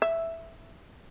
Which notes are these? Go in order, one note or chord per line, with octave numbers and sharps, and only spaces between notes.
E5